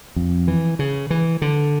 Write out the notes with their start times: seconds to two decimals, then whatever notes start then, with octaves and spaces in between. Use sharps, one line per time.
0.16 F2
0.48 E3
0.79 C#3
1.10 E3
1.42 D3